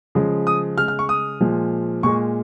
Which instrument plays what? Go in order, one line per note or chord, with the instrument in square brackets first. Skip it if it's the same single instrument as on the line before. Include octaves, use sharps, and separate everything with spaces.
[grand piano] C#3 F3 G#3
D#6
C#3 G#3 F6
F6
C#6
D#6
A#2 F3 G#3
A#2 G#3 C#6